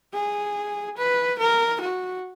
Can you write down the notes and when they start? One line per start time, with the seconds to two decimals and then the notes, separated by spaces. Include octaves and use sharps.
0.14 G#4
0.97 B4
1.39 A#4
1.81 F#4